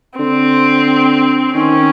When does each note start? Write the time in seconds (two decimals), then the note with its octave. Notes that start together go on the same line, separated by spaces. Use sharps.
0.19 D3 C4
1.55 D#3 C#4